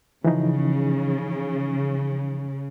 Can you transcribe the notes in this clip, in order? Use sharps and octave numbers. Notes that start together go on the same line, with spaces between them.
C#3 E3 F3 D#4